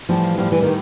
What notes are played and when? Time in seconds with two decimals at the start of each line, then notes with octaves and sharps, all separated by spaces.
0.09 A2 E3 F3 G3
0.38 A2 E3 F3 G3
0.52 E3
0.62 D#3 G3